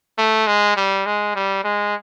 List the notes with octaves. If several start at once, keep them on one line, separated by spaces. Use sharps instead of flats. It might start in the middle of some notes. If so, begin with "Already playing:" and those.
A3
G#3
G3
G#3
G3
G#3